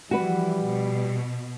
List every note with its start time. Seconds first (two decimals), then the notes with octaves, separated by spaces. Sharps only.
0.11 E3 F3 G3 F#4 B4
0.66 B2